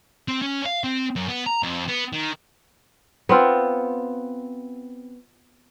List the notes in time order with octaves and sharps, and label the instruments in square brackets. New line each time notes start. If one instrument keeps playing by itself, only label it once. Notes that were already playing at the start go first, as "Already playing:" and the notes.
[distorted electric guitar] C4
C#4
F5
C4
F#2
B3
A#5
F2
B3
D#3
[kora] B3 C4 F4